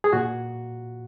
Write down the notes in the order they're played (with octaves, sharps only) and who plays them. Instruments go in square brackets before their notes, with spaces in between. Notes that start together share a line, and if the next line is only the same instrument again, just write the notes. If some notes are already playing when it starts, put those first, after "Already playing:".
[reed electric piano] G#4
A#2 F#4